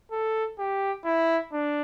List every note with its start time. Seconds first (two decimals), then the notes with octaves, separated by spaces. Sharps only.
0.12 A4
0.59 G4
1.05 E4
1.53 D4